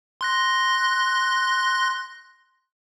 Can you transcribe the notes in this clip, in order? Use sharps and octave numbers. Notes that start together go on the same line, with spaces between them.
C6 F#6 A#6